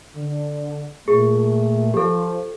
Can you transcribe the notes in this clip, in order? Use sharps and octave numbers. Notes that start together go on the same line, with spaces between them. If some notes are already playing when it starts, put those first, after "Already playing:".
D3
A#2 A3 G#4
F3 G4 A4